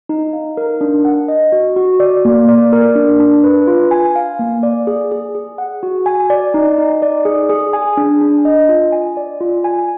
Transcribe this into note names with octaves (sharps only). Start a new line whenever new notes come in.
D#4
F5
A#4
D4
F#5
D#5
F#4
F#4
D5
A#3
D5
A#4
D4
D4
B4
F4
G#5
F5
A#3
D5
G#4
G#4
G#4
F#5
F#4
G#5
D5
D#4
D#4
D5
G#4
G#4
G#5
D4
D4
D#5
F4
G#5
D5
F4
G#5